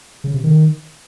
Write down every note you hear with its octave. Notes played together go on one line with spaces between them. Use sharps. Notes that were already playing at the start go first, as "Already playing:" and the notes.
C#3
C3
D#3